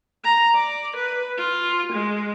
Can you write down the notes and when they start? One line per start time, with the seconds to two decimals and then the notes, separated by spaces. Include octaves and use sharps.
0.24 A#5
0.55 D5
0.96 B4
1.38 F4
1.92 G#3